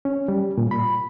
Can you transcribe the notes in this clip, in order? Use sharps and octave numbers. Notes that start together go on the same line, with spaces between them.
C#4
G3
A#2
B5